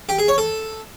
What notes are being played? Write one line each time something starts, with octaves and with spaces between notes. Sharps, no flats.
G4
G#4
C#5
A4